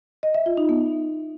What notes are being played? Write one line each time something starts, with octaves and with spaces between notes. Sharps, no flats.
D#5
E5
F4
D#4
B3